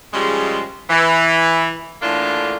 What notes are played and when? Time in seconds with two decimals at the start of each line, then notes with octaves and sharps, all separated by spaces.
0.13 C#3 F3 G3 G#3
0.90 E3
2.02 A2 D3 E3 A#3 D4 F4